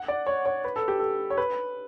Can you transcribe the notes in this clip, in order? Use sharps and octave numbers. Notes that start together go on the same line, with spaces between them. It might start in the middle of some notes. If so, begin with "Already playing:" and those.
Already playing: F#5
D5
C#5
C#5
B4
A4
G4
A4
C#5
B4